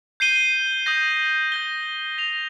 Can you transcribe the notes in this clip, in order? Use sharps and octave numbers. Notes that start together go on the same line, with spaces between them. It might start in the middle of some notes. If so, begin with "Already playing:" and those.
G6 C7 D#7 G7
D#6 G6 A#6
G6 A#6 G7
A#6 F7